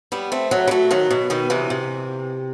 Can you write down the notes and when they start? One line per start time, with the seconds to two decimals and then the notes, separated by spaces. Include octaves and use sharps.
0.12 G3 B3
0.32 A3 C4
0.51 F#3 A3
0.68 G3
0.71 F#3 A3
0.91 D#3 F#3
1.11 B2
1.30 B2 D#3
1.50 C3 E3
1.70 C3